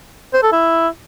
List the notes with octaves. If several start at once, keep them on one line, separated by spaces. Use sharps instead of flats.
C5
A4
E4